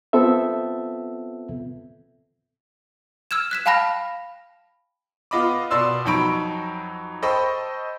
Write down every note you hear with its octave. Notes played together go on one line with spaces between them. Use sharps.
B3 C4 F4 A4 E5
E6 F6 G#6 E7
F#6 B6 E7
F5 G5 A5 B5 F6 A#6
B3 F4 D#5 B5 D6
B2 D5 C6 E6
F2 F#3 D#4 B5 C#6 D7
A4 C5 D#5 G5 B5 C#6